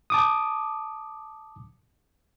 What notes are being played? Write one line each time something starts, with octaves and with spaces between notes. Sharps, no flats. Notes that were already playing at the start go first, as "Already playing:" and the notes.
A5 D6 D#6